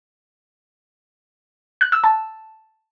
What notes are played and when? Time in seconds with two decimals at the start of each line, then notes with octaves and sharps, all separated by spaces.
1.81 F#6
1.92 E6
2.04 A5